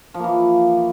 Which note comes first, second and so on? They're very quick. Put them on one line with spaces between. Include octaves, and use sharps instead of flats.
F3 A#3 E3